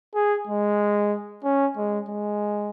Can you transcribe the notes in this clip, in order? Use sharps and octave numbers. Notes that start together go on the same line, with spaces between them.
G#4
G#3
C#4
G#3
G#3